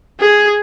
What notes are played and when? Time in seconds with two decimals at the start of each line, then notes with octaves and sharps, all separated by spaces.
0.20 G#4